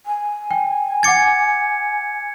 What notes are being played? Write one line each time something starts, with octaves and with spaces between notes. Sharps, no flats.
G#5
G5
F#5 D6 G#6 A6 C#7